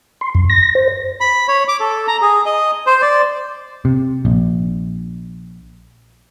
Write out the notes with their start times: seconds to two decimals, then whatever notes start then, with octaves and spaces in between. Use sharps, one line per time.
0.21 C6
0.35 F#2
0.49 A#6
0.75 C5
1.21 B5
1.48 C#5
1.68 D6
1.80 A4
2.08 A#5
2.22 G#4
2.46 D#5
2.87 C5
3.02 D5
3.85 C3
4.25 A#1